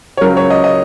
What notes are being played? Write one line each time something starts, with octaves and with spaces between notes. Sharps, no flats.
C#5
C#2 C#3 F#3 A#4
C#5
D#5
D#5